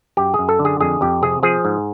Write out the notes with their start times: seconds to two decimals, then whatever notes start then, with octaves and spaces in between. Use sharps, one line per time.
0.17 F#2 G4
0.34 G#4
0.39 F#2
0.49 A4
0.59 D3
0.65 G#4
0.81 F2 G#4
1.01 F2 G4
1.22 C3 G#4
1.43 F3 G#4
1.65 G#2